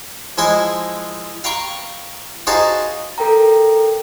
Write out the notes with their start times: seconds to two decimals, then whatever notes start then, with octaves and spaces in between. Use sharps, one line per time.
0.38 F3 G#3 E4 C5 D#5 G#5
1.44 F5 G5 A#5 B5 C#6
2.47 D#4 F#4 G#4 C5 F5 A5
3.18 A4 A#4 G5 A#5